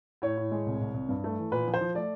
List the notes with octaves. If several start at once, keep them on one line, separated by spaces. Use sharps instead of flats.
A2 C#5
A2
G#3
C2
C2
C2
G2
A3
E3
A#2 B4
F3
C5
F3
A3 D5